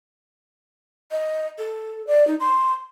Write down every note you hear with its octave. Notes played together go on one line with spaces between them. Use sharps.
D#5
A4
D5
D#4
C6